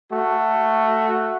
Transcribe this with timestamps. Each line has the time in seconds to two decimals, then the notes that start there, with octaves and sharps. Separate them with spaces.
0.11 A3 F#4